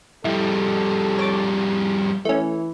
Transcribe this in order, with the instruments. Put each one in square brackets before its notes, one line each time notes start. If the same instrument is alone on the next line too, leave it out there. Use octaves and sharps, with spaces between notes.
[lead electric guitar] F2 G3 [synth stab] E4 [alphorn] A4
[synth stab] C#5 D6 A6
[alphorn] E3 [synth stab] A3 C#4